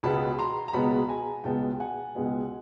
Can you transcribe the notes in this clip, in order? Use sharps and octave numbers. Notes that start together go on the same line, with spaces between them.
C#2 B2 G#3 B3 A5 B5
A#5 C6
A#5
C#2 B2 G#3 B3 A5 B5
G#5 A#5
C#2 B2 G#3 B3 G5 A5
F#5 G#5
C#2 B2 G#3 B3